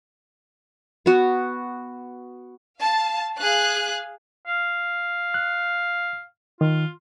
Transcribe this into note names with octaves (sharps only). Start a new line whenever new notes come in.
B3 F#4
F5 A5
G#4 F5 F#6
F5
F#6
D#3 F4